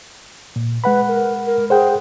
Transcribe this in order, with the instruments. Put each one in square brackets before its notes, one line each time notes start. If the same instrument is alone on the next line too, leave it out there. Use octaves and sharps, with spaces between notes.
[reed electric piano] A#2
[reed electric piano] G#3 F#5 B5 [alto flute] B4
[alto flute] A#4
A#4
[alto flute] G#4 [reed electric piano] C5 F#5 G5